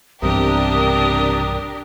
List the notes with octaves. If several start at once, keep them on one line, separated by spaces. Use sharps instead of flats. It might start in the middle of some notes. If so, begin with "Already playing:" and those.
B1 G2 C3 E3 D4 G4 A#4 D#6